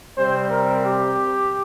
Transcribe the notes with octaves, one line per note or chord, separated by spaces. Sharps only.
C3 G3 C4 C5
A#4
G4